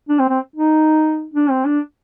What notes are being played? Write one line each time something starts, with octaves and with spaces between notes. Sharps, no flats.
D4
C4
C4
D#4
D4
C4
D4